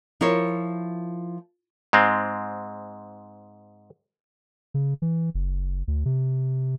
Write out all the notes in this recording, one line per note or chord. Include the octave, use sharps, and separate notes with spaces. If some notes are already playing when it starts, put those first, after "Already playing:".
F3 E4 A#4 C5 C#5
G#2 G#3 C4
C#3
E3
F#1
D2
C3